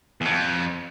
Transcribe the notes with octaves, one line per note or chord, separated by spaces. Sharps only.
E2
F2